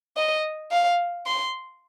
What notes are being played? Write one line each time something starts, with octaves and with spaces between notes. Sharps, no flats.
D#5
F5
C6